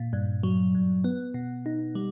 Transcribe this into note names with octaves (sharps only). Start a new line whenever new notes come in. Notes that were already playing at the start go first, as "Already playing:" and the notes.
Already playing: A#2
G2
F#3
G2
B3
B2
D#4
G3